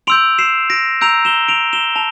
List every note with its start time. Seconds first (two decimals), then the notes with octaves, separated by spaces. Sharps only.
0.07 C6 E6 G6 D7 F7
0.38 C7 E7
0.70 A#6 D7
1.01 A#5 E6 G6 D7 F7
1.25 E7 G7
1.48 D7 F7
1.73 E7 G7
1.96 A5 F7